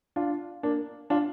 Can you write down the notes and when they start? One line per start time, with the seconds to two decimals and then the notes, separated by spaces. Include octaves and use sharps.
0.16 D4 F4
0.63 A#3 D4
1.10 D4 F4